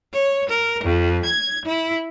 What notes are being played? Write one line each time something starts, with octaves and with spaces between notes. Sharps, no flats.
C#5
A#4
F2
G#6
E4